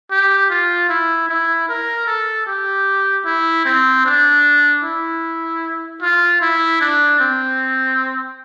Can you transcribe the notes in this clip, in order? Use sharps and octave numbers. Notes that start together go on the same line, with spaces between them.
G4
F4
E4
E4
A#4
A4
G4
E4
C4
D4
E4
F4
E4
D4
C4